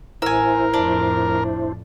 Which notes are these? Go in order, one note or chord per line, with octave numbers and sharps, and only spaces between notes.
A1 E4 A#4 C5 G#5 E6
F2 A2 D4